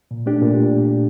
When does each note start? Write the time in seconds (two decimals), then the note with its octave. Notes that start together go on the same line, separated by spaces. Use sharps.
0.11 A#2
0.26 A3 D4 G4
0.42 A#2